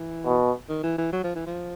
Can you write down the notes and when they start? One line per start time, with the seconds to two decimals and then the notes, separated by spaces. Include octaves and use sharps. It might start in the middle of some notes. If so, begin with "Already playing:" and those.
Already playing: E3
0.25 B2
0.69 D#3
0.83 E3
0.98 E3
1.13 F#3
1.24 F3
1.35 E3
1.46 F3